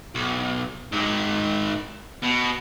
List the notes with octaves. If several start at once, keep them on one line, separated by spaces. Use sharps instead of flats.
B1
G#2 D#3
B2